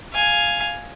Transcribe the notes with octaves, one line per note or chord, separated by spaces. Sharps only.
F5 G#5